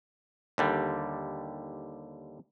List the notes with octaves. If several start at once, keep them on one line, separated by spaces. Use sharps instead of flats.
D#2 D3 G3